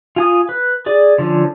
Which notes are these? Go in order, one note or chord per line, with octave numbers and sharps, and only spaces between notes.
F4 G#5 D#6
B4
G#4 D5
D3 F3 C#4